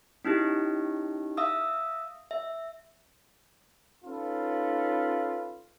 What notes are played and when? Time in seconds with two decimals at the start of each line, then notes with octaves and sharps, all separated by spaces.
0.25 C#4 D#4 E4 G4
1.37 E5 F5 D#6 E6
2.31 E5
4.05 C#4 D#4 F4 A4 B4